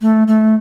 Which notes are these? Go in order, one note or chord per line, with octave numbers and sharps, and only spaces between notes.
A3
A3